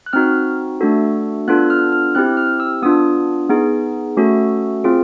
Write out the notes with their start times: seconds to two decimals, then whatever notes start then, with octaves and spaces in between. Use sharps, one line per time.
0.06 F#6
0.13 C4 D#4 F#4 F6
0.81 A3 D4 F#4 A4
1.48 B3 D4 F4 A4 F#6
1.70 F6
1.92 F6
2.15 C4 E4 G4 F#6
2.37 F6
2.60 E6
2.82 B3 D4 F4 D#6
3.49 B3 D#4 G#4
4.17 A3 C#4 F#4 A4
4.84 C4 F4 G#4